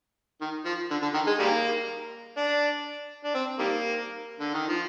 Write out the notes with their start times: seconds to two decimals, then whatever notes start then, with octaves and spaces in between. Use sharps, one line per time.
0.41 D#3
0.65 F3
0.91 D3
1.02 D3
1.14 D#3
1.27 G#3
1.40 D#3 G3 A#3
2.37 D4
3.25 D4
3.35 C4
3.59 D#3 G3 A#3
4.40 D3
4.54 D#3
4.68 F3